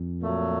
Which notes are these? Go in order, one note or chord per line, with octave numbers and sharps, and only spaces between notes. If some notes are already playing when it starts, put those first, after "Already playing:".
Already playing: F2
A#2 F#3 A3